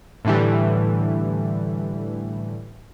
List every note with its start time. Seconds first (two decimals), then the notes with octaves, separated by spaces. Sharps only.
0.25 A2 D3 E3 G3